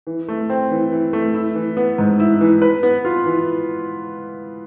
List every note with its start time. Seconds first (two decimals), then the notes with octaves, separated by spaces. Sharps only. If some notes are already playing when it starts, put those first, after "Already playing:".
0.07 E3
0.28 A3
0.50 C4
0.71 E3
0.92 E3
1.13 A3
1.34 E4
1.55 E3
1.77 B3
1.98 G#2
2.20 E4
2.41 E3
2.62 B4
2.83 B3
3.05 F4
3.26 E3